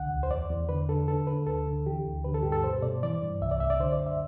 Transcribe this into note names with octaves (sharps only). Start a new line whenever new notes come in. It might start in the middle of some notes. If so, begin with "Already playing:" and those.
Already playing: C2 D3 F#5
D2
C5
E2 D5
E2
D3 B4
D3 A4
D3 A4
D3 B4
D2 A4
D3
E3 G4
D2
D3 B4
A4
G2 G4
A4
B2 C5
B2 D5
E3 D5
G2
C2 E5
D5
C2 E5
D5
D3 C5
D5
F#2
E5